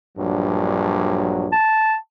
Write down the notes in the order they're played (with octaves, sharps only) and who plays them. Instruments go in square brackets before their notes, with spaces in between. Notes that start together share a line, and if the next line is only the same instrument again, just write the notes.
[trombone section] A#1 G2 F#3
[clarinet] A5